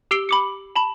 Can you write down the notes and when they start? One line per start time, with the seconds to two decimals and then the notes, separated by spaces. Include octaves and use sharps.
0.11 G4 E6 C7 D7 G7
0.29 B5 D6 C#7
0.76 A5 B5